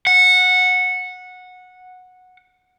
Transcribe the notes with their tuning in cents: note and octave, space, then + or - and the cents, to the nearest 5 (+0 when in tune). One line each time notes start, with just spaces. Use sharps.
F#5 -15